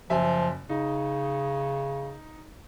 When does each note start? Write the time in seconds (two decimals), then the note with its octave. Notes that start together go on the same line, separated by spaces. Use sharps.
0.10 F#1 F3 E5 G#5
0.69 C#3 D#4